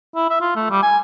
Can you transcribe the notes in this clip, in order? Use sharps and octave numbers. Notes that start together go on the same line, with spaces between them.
E4
E5
F4
A3
G3
G#5